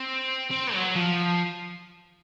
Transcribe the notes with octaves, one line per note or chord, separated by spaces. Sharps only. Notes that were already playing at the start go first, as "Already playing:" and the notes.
Already playing: C4
C4
F#3
F3